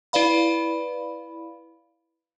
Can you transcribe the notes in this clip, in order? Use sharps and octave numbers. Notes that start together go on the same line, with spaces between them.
E4 B4 D5 F5 B5